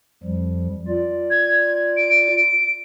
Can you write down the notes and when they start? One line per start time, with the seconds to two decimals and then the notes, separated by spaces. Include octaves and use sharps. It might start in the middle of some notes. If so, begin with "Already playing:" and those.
0.23 F2 F3 G3
0.88 F4 D5
1.31 G#6
1.97 D7